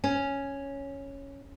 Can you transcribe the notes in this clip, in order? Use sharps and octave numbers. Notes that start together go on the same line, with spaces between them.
C#4